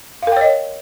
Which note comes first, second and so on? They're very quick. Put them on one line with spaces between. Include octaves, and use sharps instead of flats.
F5 A#4 G5 C#5 D#5